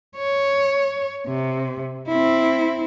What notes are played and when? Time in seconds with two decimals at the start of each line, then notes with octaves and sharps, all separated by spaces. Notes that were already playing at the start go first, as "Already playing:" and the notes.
0.17 C#5
1.27 C3
2.08 C4 E4